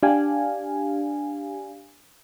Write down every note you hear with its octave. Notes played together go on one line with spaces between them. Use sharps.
D4 G4 F5 G#5